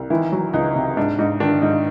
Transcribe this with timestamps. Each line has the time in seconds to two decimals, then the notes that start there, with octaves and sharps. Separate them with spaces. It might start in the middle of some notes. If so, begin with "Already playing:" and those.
Already playing: C2
0.10 D#3 E3 E4
0.32 F#3
0.53 C#2 D#4
0.75 C3
0.97 G#2 D4
1.19 G#2 D#4
1.40 D#3 D4
1.62 G#2 D#4